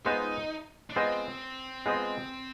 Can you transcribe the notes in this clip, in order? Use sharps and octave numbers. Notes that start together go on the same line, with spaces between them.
G#3 B3 D#4 F4 C5 D#5
D4
G#3 B3 C4 F4 C5 D#5
G#3 B3 F4 C5 D#5